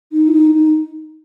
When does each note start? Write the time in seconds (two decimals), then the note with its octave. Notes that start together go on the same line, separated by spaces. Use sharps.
0.12 D#4
0.28 E4
0.33 D#4
0.54 D#4